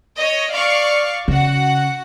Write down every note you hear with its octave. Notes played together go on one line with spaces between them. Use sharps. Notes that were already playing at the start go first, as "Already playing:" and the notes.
C#5 D#5
D5 F5 C#6
C#3 F#4 F#5